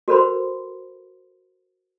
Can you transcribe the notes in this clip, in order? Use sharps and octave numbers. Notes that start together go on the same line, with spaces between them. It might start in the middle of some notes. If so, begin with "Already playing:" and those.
F#4 A4 A#4 C5 B5 C6